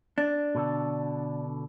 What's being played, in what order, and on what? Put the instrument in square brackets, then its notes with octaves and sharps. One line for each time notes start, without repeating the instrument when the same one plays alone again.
[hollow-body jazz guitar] D4
[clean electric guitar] B2 D3 A4